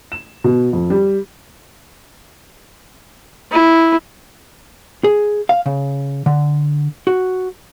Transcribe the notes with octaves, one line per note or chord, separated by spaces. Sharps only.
E7
B2
F2
G3
E4
G#4
F5
C#3
D3
F#4